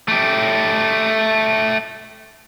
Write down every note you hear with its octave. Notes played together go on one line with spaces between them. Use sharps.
A3 G4